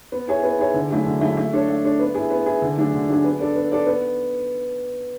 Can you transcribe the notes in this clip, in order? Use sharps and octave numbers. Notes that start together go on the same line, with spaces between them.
B3
E4 G#4 C#5
B3
E4 G#4 C#5
D3
F#3 A3 E4 G#4
D3
F#3 A3 E4 G#4
A3
D4 A4 C#5
A3
D4 A4 C#5
B3
E4 G#4
B3
E4 G#4
D3
F#3 A3 D4 G#4
D3
F#3 A3 D4 G#4
B3
D4 A4 D5
B3
D4 A4 D5
B3